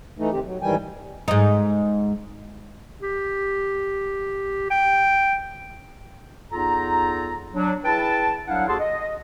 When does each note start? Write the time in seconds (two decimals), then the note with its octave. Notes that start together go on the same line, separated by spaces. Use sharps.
0.19 E3 A3 D#4
0.32 D#2 C3 D#3 C4 G4
0.44 F#3
0.62 G#2 D#3 E3 G3 G5 G#5
1.28 G#2 D#4
3.01 G4
4.70 G5
6.52 E2 D#4 F4 A4 A#5
7.54 F#3 D4
7.84 E4 G#4 B4 G5 A5
8.48 C2 F#3 D4 E4 F5 F#5
8.68 D#2 F#4 G#4 A4 A5 C6
8.80 D#5